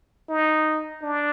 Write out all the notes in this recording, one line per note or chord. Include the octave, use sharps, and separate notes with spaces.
D#4
D4